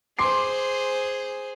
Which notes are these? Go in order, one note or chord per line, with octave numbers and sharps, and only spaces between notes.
G#4 C5 C6 D6 C7